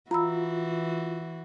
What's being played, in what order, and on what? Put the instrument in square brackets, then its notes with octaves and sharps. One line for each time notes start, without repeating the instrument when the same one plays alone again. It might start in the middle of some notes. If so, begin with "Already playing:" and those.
[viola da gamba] E3 F#4 [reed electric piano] F4 [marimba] A#5 B5 E6